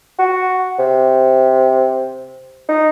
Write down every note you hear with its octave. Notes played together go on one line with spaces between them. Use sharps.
F#4
C3
D#4